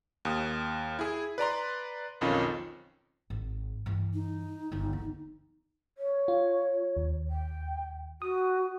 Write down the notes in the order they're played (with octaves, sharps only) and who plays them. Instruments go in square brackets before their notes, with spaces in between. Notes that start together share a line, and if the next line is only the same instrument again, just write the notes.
[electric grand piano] D#2 D#6
E4 G#4
B4 D5 A#5 C6
B1 F2 D#3 C#4 F4
[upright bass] G#1
G2 E3
[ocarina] D#4
[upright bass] G1 D#3
E2
[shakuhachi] C#5
[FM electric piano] F4
D#2
[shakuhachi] G5
[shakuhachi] F#4 [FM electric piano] D#6